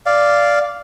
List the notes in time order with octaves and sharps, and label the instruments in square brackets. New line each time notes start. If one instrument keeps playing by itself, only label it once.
[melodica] D5 F5